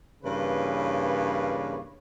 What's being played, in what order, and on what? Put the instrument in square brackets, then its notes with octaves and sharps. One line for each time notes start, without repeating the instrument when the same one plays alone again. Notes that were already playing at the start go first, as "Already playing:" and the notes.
[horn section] G2 C#3 E3 A#3 B4 C#5